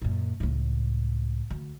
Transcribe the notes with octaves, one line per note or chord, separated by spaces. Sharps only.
F#2 A#2
C#2 A2
D2